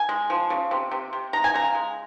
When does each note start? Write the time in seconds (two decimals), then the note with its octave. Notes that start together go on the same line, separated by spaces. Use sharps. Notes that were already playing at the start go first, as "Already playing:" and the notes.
Already playing: G#5
0.09 G#3
0.30 F3
0.50 C#3
0.71 C3
0.91 C3
1.13 C3
1.33 G#3 A#5
1.44 G#5
1.54 C#3 A#5
1.75 G#3